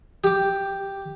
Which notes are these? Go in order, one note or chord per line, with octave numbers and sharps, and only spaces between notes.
G4 D6